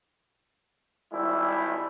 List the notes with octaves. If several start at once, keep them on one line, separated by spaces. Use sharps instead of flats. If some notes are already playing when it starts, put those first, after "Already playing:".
G#1 G3 E4